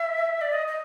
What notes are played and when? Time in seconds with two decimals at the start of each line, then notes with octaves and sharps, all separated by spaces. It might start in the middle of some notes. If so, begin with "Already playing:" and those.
Already playing: E5
0.41 D5
0.53 D#5
0.67 D#5